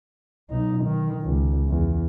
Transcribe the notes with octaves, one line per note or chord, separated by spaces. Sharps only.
B1 D#4
D#3
C#2
E2